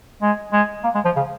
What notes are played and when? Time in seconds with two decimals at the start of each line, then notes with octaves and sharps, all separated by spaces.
0.22 G#3
0.53 G#3
0.84 A#3
0.95 G#3
1.05 F3
1.16 C#3